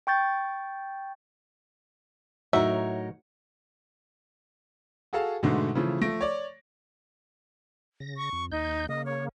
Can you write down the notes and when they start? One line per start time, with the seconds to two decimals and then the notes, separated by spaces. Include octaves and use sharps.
0.07 G5 C#6 G6 A6
2.53 A2 F#3 D#4 F#4 A#4 C#5 E5
5.13 F#4 G#4 A4 F5 A5
5.43 G#2 B2 D3 G#3 A3
5.75 C#3 E3 F3 A3
6.01 F3 A3 A#6 D7
6.21 C#5 D5
8.00 C#3 A#6
8.17 C#6
8.33 F2
8.52 D#2 D#4 G6
8.89 C#3 A#3 D#5
9.05 C#5